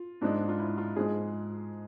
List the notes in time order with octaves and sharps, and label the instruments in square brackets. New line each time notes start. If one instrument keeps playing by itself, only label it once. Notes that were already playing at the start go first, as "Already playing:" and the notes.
Already playing: [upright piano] F4
G#2 F3 G#3 D4
F4
E4
F4
G#2 F3 G#3 G#4